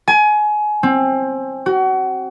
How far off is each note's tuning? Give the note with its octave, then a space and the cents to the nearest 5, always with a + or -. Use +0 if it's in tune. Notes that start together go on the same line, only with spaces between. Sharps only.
G#5 +25
C4 +25
F#4 +30